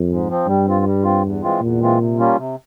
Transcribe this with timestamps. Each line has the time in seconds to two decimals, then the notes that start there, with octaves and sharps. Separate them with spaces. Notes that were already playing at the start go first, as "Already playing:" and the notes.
Already playing: F2
0.09 G#2
0.28 F3 C4
0.47 G2 G3
0.66 C4 F4
0.85 G3
1.04 C4 F4
1.23 E2
1.42 E3 G#3 C4 F4
1.61 E2 A#2
1.80 E3 G#3 C4 F4
1.99 C3
2.18 G3 A#3 C#4 F4
2.37 C3